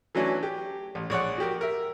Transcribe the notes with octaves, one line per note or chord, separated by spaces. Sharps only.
E3 F#3 A3 C#4 D4
G4
A1
A#1 C#5 D5 F#5
F#4 G4 A#4
A#4 E5